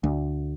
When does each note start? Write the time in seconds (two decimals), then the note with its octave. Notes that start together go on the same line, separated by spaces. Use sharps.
0.04 D2